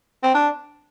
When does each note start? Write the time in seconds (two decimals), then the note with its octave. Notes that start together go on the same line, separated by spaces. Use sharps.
0.23 C4
0.34 D4